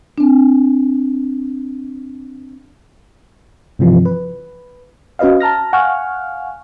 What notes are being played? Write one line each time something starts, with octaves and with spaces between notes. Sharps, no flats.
C4 D4
G2 C3 E3 F3
B4
C#4 F#4 B4 D#5 F5
A5 A#5 F6 A#6
F5 F#5 G#5 C#6 F6